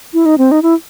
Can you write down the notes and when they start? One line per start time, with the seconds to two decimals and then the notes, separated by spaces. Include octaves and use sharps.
0.14 E4
0.26 D#4
0.38 C4
0.51 D#4
0.63 E4